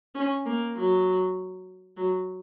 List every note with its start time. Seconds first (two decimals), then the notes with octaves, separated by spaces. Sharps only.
0.15 C#4
0.46 A#3
0.76 F#3
1.97 F#3